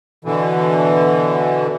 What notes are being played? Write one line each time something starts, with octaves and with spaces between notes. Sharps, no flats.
B2 D3 E3